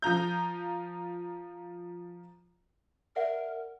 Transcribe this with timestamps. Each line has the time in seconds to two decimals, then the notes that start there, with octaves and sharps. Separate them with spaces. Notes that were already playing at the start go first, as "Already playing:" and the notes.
0.02 F3 F4 A#5 G6
3.16 A#4 D5 E5 F#5